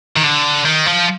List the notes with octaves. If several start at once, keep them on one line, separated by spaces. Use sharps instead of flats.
D#3
D3
D#3
F3